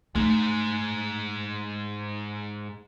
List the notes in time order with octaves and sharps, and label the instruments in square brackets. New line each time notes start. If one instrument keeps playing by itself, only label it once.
[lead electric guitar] G#2 G#3 [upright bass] A3 D#4